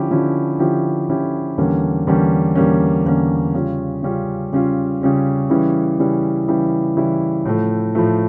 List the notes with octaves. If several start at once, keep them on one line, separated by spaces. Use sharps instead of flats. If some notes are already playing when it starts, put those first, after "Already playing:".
Already playing: D3 F3 C#4 E4 G4
D3 F3 C#4 E4 G4
D3 F3 C#4 E4 G4
D3 F3 C#4 E4 G4
E2 D3 G3 A#3 C#4
E2 D3 G3 A#3 C#4
E2 D3 G3 A#3 C#4
E2 D3 G3 A#3 C#4
C#3 G3 C#4 F4
C#3 G3 C#4 F4
C#3 G3 C#4 F4
C#3 G3 C#4 F4
C#3 E3 G3 C#4 E4
C#3 E3 G3 C#4 E4
C#3 E3 G3 C#4 E4
C#3 E3 G3 C#4 E4
A2 F3 A3
A2 F3 A3